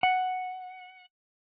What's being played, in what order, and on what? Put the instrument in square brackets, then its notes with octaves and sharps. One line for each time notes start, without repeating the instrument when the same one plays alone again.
[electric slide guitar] F#5